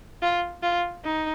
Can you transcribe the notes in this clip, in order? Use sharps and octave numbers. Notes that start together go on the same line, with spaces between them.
F4
F4
D#4